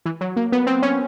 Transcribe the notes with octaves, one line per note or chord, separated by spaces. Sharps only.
E3
F#3
A#3
B3
C4
C#4